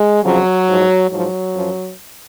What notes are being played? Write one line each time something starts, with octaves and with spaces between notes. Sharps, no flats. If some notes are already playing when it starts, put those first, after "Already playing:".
Already playing: G#3
F2 C#3 F3 F#3
G#2 F3
G#2 F3 F#3
F#2 F3